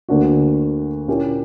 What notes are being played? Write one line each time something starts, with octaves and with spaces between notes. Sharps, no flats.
D2 D3 A#3 D4 F#4
A#2 A#3 C#4 E4 G4